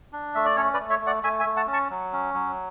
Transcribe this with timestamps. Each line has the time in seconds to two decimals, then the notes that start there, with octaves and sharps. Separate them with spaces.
0.13 D4
0.35 A3 E5
0.45 D5
0.56 C#4 A4 C#5
0.74 B4 D5
0.79 A3
0.90 C#5 E5
1.01 A3
1.06 D5 F#5
1.23 A3 E5 G#5
1.39 E5 G#5
1.45 A3
1.56 F#5 A5
1.67 C#4
1.73 A5 C#6
1.90 F#3
2.13 C#4
2.34 F#3